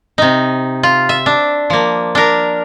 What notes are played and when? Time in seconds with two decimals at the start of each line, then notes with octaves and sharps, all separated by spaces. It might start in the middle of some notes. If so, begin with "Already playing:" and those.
0.18 C3 D#4
0.83 F4
1.09 E5
1.26 D4
1.70 F3 A#3
2.15 D4 A#4